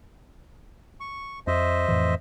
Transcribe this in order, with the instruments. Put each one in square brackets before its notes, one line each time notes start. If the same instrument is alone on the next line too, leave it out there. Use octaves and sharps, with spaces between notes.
[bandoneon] C#6
[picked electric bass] F2 [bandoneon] C5 D#5 E5
[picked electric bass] F2 A2 E3